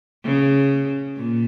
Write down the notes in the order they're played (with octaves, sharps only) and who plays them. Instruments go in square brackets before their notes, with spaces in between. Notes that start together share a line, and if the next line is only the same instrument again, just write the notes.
[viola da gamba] C#3
A#2